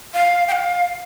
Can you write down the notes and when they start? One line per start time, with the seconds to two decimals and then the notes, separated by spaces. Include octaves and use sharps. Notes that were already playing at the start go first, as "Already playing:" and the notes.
0.14 F5
0.48 G5
0.52 F5